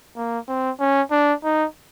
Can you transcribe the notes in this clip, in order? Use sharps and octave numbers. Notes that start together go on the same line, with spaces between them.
A#3
C4
C#4
D4
D#4